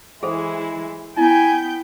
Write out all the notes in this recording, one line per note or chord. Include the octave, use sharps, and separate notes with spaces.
E3 G#3 E4 G#4 A4 C5
B3 E4 G5 G#5 G6